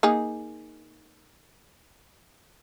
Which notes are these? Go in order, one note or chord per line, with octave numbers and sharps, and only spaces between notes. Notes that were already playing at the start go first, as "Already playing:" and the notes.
A#3 D#4 G#4